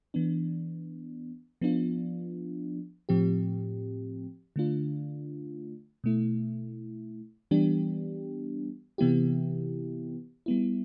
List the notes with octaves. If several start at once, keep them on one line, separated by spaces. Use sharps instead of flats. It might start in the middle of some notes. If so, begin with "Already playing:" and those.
E3 B3 D4
F3 B3 D4 F4
A2 F3 C4 G4
D3 A3 D4 F4
B2 A3 E4
E3 G3 B3 D4 G4
C3 E3 B3 E4 G4
G3 B3 E4